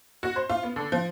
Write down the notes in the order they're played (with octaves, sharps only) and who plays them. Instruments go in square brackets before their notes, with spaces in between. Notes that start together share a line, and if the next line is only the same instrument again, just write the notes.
[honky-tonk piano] F#4
C5
F4
B3
D3
F3